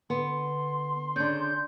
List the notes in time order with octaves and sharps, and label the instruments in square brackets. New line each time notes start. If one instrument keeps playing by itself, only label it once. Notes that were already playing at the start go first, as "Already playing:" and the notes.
[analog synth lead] D3 [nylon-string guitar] B3 [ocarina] C6
[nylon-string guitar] C#3 D4 [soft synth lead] G6